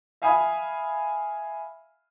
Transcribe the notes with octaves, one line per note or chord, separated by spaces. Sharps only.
E5 F5 G#5 B5 D#6